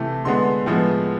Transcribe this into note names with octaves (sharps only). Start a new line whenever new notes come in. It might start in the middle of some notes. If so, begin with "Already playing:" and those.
Already playing: C3 E3 A3
D3 G#3 B3 C6
A2 F3 G#3 B3